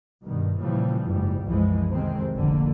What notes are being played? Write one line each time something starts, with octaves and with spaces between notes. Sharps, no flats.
G2 B2 D#3
A#2 C#3 E3 F3 G3
F#1 G#2 G3
C2 F#2 E3 F3 G#3
F2 C3 D#3 G#3 C4
F1 A#1 D3 A#3